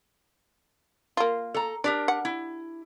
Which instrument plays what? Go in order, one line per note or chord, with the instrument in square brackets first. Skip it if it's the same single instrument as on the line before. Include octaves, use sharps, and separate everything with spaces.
[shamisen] A#3 F4
[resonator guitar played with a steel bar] A4 A#5
[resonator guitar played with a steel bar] D4 G4 A#4 [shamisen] D5
[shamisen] F#5
[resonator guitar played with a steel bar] E4